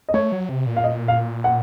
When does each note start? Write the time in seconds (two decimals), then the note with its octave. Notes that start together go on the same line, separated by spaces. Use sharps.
0.09 D#5
0.14 A3 C#5
0.32 F#3
0.49 C3
0.67 A#2
0.76 F5
0.84 D#5
1.08 F5
1.44 F#5